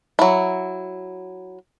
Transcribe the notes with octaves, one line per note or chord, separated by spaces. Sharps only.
F#3 E4